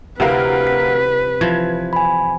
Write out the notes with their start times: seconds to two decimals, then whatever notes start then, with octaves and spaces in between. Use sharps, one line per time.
0.20 D2 C3 E4 A#4 B4 F5
0.67 B6
1.41 E3 F3 G#6
1.93 G#5 B5